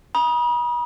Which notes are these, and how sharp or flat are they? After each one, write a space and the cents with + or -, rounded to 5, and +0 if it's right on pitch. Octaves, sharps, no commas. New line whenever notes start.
B5 -45 D#6 +0